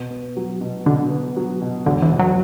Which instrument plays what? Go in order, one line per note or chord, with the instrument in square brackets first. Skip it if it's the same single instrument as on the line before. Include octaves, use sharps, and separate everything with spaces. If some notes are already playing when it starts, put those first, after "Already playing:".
Already playing: [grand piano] B2
B3
F#3
B2
[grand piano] B2 [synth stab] D3
[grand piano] B3
F#3
B2
[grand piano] E1 [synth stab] D3
[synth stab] E3
[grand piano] B2
[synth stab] F#3